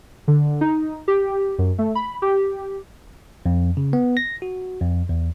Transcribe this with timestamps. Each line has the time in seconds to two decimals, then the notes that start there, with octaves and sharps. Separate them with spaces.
0.28 D3
0.61 D#4
1.08 G4
1.58 F#2
1.78 A3
1.95 B5
2.22 G4
3.46 F2
3.77 C#3
3.93 B3
4.17 A#6
4.42 F#4
4.81 F2
5.09 E2